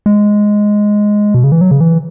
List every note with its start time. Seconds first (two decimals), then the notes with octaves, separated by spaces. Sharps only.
0.06 G#3
1.34 B2
1.44 C#3
1.52 E3
1.61 F#3
1.71 C#3
1.80 E3